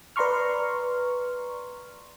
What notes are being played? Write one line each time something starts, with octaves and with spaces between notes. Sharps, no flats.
B4 D5 A#5 C6 C#6 F6